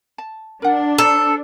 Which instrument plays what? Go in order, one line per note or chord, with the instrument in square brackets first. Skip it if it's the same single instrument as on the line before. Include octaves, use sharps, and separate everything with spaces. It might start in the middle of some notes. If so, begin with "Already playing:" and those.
[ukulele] A5
[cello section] D4 [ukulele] A#4 F#5
[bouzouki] A4 [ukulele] C5 A#5